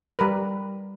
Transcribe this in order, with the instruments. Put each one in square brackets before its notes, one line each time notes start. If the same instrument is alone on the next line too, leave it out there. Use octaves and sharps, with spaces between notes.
[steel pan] G3 A#4 B4